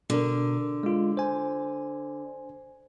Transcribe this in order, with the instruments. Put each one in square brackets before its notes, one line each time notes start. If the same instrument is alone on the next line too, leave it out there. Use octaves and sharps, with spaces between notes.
[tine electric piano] B2 A#4 [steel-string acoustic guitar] D3
[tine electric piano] G#3 F4
C5 G#5